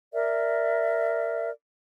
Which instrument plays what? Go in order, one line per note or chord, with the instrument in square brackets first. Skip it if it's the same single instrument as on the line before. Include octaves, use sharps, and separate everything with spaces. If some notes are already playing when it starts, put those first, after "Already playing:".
[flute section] A#4 D5 E5